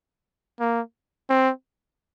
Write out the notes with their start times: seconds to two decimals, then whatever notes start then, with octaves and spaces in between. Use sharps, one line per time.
0.60 A#3
1.30 C4